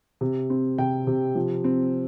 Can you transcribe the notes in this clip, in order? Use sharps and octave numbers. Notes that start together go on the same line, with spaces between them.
C3
C4
C3 G5
C3
F3
C4